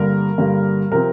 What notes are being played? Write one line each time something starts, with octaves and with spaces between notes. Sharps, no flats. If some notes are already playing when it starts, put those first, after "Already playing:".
Already playing: G2 D3 G3 A#3 A#4
G2 D3 G3 A#3
C3 F3 C4 A#4